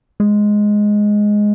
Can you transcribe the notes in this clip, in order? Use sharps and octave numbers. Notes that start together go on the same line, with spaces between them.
G#3